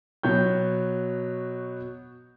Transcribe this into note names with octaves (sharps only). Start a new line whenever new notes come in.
B2 F#3 C#5 G6